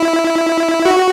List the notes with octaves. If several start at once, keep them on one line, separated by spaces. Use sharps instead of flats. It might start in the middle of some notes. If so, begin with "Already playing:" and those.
Already playing: E4
F#4